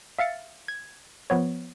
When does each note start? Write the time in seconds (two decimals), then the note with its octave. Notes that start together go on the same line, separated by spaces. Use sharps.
0.19 E5 F5 A6 C#7
0.68 G#6
1.30 F3 B3 C#5